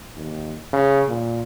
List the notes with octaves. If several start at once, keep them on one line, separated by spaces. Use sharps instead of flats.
D#2
C#3
A#2